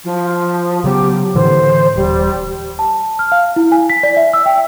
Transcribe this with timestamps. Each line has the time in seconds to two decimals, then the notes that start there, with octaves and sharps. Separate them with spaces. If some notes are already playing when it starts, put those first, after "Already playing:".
0.04 F3
0.84 C#3 F#3 B3 G4
1.35 A2 D3 E3 C5
1.96 D#1 G3
2.79 A5
3.19 F6
3.32 F5
3.56 E4
3.72 G#5
3.90 B6
4.03 D5
4.17 E5
4.33 E6
4.46 G5